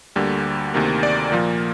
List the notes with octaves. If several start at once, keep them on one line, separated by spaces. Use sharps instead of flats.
D2 D3 G3 A#3
D2 C3 D#3 A#3
D5
A#2 F3 A#3